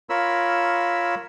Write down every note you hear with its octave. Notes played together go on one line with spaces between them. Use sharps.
F4 A#4 C#5 B5 E6